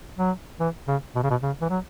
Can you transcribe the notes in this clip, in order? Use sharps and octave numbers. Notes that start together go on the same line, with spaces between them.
F#3
E3
C#3
B2
C#3
B2
C#3
E3
F#3